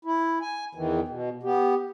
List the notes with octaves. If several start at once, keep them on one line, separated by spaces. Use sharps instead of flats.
E4
G#5
E2 D#3 E3
B2
B3 G4